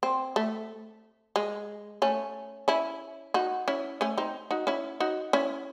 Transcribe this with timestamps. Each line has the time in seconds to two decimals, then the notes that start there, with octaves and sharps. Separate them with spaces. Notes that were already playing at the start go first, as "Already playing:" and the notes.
0.03 C4
0.36 A3
1.36 G#3
2.02 A3 C#4
2.68 C#4 E4
3.34 D#4 F#4
3.68 C#4 E4
4.01 A3 C#4
4.18 C4 D#4
4.51 D#4 F#4
4.67 C#4 E4
5.00 D#4 F#4
5.33 C#4 E4